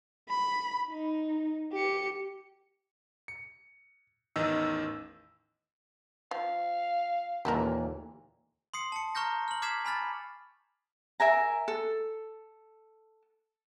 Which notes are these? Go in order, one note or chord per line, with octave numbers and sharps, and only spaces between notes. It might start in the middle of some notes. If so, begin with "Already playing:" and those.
B5
D#4
G4 C#7
C#7
A1 E2 D#3 D#5 E6
F3 F5
D#2 A#2 E3 G4 A4 A#4
C6 D#6 C7 C#7
A5 C#7
A#5 C#6 F6 G6 A#6
F6 F#7
D6 F6 G#6 B6 C7 E7
G#5 B5 F6 A6
A#4 E5 G#5 A#5
A4